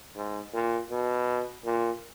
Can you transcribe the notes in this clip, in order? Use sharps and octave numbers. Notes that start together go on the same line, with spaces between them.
G#2
A#2
B2
A#2